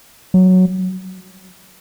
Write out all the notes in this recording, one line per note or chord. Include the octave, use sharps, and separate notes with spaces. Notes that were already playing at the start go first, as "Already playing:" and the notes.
F#3